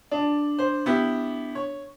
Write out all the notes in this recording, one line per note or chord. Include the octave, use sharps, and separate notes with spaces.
D4
C5
B3 E4 G4
C#5